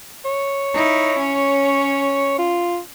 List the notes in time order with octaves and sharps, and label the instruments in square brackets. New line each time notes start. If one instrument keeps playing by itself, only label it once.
[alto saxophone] C#5
[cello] D#4 E4
C#4
[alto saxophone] F4